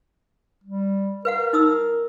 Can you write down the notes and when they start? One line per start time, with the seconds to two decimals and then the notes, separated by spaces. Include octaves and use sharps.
0.64 G3
1.25 A#4 B4 F5 F#5
1.53 D#4 D#6 E6